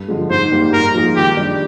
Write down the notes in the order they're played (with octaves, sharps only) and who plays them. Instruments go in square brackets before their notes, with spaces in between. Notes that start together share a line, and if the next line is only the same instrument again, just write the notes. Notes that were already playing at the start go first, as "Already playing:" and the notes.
Already playing: [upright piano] G2
D3 F3 G#3
[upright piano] G#2 [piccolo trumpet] C5
[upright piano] G3 A#3
[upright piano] G#2 [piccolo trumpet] A#4
[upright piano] F3 A#3 F4 G#4
[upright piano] D#3 [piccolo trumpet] G4
[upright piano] G3 D4